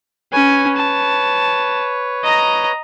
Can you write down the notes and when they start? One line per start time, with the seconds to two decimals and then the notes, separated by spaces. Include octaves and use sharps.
0.32 C#4 B4 C#5 G#5
0.76 A5
2.24 D#5 A#5